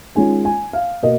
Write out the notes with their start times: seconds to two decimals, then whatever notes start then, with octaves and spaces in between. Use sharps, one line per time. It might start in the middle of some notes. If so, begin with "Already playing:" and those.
0.15 D#3 G#3 C#4 F4 G#5
0.45 G#5
0.73 F5
1.03 B2 A#3 D#5